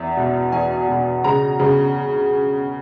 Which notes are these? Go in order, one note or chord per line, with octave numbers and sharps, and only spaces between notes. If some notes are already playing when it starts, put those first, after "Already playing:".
Already playing: E2 E5
B2
E2 G#5
B2
C#3 A#5
C#3